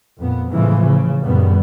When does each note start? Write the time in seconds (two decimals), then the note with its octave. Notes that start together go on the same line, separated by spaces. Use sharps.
0.18 F2 A#2 B3
0.50 A2 C#3 E3 F3 G#3
0.85 C#3
1.22 C#2 F#2 A#2 D#3 G3 B3